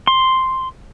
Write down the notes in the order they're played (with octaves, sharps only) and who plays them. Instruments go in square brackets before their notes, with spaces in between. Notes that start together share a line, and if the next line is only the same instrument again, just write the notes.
[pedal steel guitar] C6